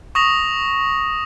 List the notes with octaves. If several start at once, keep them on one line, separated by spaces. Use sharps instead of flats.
C#6 D#6 A#6 F7